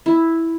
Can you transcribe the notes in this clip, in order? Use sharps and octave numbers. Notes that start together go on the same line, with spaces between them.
E4